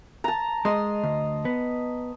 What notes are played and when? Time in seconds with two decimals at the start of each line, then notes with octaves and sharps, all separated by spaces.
0.24 A5 A#5
0.65 G#3 D#5 C6
1.03 D2
1.45 B3